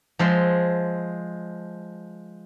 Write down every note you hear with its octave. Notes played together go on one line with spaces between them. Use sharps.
F3 G#3 E5 C6